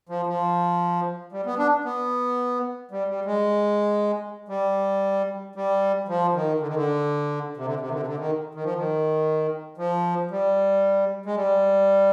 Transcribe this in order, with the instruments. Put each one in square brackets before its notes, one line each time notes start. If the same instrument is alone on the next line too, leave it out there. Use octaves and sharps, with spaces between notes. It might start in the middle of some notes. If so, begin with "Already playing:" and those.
[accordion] F3
F3
G3
B3
D4
B3
G3
G3
G#3
G3
G3
F3
D#3
D3
D#3
D3
C3
D3
C3
D#3
D3
C3
D3
D#3
D#3
F3
D#3
F3
G3
G#3
G3